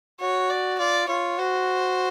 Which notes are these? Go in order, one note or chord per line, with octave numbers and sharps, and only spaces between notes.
F#4 C#5
D5
F4 D5
F4 C#5
F#4 C5